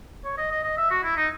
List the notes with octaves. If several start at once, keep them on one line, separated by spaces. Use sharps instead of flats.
C#5
D#5
D#5
D#5
E5
F#4
E4
D#4